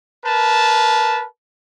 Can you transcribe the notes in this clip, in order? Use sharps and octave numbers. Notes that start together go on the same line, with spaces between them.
A#4 B4 A5